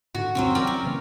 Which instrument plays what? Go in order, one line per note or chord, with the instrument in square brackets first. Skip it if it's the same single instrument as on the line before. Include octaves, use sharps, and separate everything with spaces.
[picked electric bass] G#2 D3 [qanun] F#4
[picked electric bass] D2 G2 C3 [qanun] F#3 C4 C#4
[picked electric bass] E3 F#3 [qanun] A#4 D5 G5
[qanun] C#4
[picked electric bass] C#3 E3 A#3